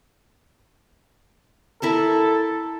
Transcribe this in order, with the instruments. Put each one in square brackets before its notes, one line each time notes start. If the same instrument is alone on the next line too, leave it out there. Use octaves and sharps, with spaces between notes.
[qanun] E4 A#4 A5 [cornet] A4